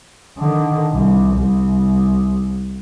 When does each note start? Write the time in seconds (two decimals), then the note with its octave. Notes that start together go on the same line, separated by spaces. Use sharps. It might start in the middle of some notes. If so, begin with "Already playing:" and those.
0.38 D3 D#3
0.92 C2
1.36 C2